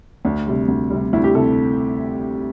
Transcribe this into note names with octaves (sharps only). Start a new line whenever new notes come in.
D2 D4
C3 G3
D2
C3 G3
D2 E4
G4
C3 A4